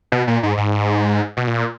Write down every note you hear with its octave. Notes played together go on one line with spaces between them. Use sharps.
B2
A#2
G#2
G#2
B2
A#2